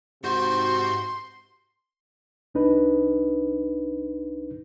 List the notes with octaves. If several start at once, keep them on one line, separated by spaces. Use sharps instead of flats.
G#2 C3 F#4 C6 G6
C2 D4 D#4 B4